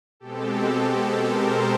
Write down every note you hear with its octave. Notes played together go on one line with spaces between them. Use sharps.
B2 G#3 C4 G4 A4
A#4 C5